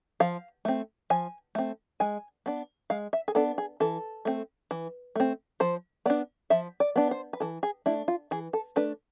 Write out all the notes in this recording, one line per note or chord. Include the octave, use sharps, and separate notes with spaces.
F3 F5
A3 C4
F3 G#5
A3 C4
G#3 G#5
B3 D4
G#3 F5
E5
G#4
B3 D4 A4
G#4
E3 A4
A3 C4
E3
A3 C4
F3 C5
B3 D4 D5
F3 E5
D5
B3 D4
C5
B4
E3 A4
G#4
A3 D4 E4
F4
E3 G#4
A4
A3 D4 B4